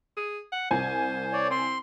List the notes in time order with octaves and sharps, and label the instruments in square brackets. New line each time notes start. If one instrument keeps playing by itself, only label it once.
[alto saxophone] G#4
F#5
[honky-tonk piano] C2 G#5 [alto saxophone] C5
[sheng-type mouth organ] C#5 D5
[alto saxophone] C4 [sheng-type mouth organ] C6